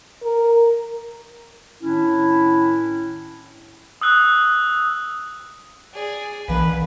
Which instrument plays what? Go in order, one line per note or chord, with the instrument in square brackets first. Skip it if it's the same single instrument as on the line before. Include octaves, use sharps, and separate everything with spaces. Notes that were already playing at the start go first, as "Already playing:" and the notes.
[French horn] A#4
[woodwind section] A2 D#3 C#4 D4 E4
[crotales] D#6 E6 F#6
[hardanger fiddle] G#4 D5
[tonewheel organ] B1 [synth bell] E3 F5 B6 [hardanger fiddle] A#3 B4